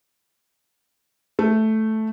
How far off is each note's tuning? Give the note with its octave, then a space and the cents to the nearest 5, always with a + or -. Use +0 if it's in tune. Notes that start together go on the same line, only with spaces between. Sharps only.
A3 -5